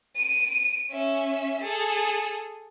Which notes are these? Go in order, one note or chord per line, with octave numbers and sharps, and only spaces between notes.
D7 D#7
C#4 E5
G#4 A4